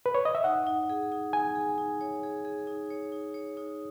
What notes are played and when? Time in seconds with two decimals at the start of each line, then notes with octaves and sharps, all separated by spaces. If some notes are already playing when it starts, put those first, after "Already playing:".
0.06 B4
0.15 C#5
0.25 D#5
0.35 E5
0.44 D#4 F#5
0.67 D#4
0.90 G#4
1.12 D#4
1.33 D#4 G#5
1.55 G#4
1.78 D#4
2.01 C#5
2.23 G#4
2.45 G#4
2.67 D#4
2.91 C#5
3.12 D#4
3.34 C#5
3.57 D#4